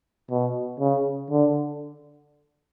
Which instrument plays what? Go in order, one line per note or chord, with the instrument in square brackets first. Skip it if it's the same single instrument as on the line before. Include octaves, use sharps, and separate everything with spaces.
[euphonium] B2
C#3
D3